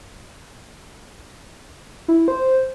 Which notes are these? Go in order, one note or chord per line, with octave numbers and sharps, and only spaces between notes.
E4
C5